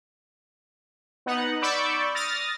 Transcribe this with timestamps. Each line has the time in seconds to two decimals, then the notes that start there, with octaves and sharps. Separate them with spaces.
1.26 B3 D#4 F#5
1.62 D5 B5 C#6 D6 E6 G6
2.15 D#6 F6 A6 A#6